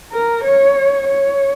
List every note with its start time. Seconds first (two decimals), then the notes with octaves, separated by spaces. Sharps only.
0.12 A#4
0.44 C#5
1.07 C#5